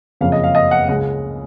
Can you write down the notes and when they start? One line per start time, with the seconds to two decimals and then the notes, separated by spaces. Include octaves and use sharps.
0.21 F#1 F2 C#3 F5
0.32 D#5
0.44 F5
0.55 D#5
0.71 F#5
0.88 C#2 C#3 G#3 F#5